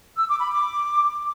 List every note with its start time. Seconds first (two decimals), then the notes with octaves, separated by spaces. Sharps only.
0.16 E6
0.28 D6
0.39 B5
0.51 D6